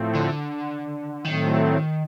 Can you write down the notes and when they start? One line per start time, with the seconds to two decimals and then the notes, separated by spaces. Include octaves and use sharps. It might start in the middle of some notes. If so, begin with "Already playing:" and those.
Already playing: A2 F3 A3 C4
0.15 D3
1.25 A2 D#3 F#3 A3 C4